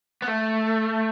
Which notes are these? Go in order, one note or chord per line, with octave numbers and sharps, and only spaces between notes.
B3
A3